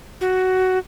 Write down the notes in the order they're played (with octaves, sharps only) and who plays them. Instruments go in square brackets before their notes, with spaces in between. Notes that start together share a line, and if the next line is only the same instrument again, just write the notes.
[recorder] F#4